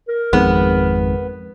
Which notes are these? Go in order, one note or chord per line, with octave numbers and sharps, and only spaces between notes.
A#4
G#1 F2 G#2 B3